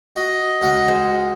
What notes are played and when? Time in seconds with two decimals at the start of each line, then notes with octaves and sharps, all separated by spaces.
0.16 F#4 D#5
0.62 C#2 F#4 F#5
0.88 G#3 C5